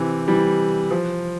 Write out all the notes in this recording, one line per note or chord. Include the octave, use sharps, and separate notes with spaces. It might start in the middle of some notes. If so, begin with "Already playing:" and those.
Already playing: C3 E3
E3 G3
F3